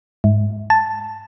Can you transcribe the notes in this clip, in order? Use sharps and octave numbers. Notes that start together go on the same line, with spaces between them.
G#2
A5